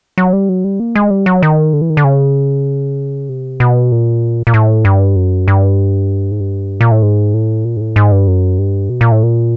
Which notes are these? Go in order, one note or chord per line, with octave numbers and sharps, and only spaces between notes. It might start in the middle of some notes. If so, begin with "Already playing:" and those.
F#3
G3
F#3
G3
A#3
G#3
G3
F#3
D#3
D3
E3
D#3
D3
C#3
C3
B2
A#2
A#2
A2
G2
F#2
G2
G#2
G2
A#2
A2
G#2
A2
A#2
G#2
A2
G#2
G2
F#2
G2
B2
A#2
A2
A#2